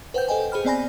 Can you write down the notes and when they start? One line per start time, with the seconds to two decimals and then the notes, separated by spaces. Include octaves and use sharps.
0.14 B4 C5 F#5 G5 G6
0.28 A4 C5 D#5 G5 G#5
0.52 G#4 C5 B5 F6
0.65 B3 C4 D5 G#5 B5 A#6